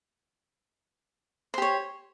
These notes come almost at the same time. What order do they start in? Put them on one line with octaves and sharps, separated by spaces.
C5 G4 C#5